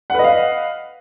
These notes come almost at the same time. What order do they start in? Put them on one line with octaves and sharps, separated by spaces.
F#5 B4 D#5 F5